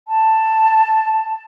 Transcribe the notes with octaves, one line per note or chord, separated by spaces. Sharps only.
A5